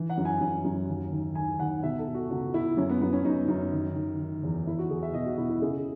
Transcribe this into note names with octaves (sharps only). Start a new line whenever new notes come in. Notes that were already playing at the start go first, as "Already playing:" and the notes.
Already playing: E3
F#5
F#2
G#5
F#2
F#2
D#2
D#3
D#3 G#5
D#2 F#5
B2 E5
A4
B2
F#4
C#2 F#4
B2 E4
F#2 C#4
B3
F#2 B3
C#4
F#2 D#4
F#2 D#4
D#3
D#3
D#3
E2
E2 E4
F#4
E2 G#4
E5
B2 D#5
F#4
B2 E4
E4
C#3 G#4